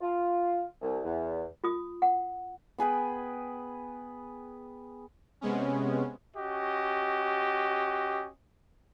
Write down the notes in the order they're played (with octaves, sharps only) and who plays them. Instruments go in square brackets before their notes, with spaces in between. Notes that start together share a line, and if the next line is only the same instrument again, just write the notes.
[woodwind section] F4
C2
E2
[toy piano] F4 D#6
F#5
[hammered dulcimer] B3 G#4 B4 G5
[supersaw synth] C3 G#3 B3 C#4
[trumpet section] C#4 F#4 G4 D#5